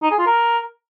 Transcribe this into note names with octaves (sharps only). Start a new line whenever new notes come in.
D#4
G#4
F4
A#4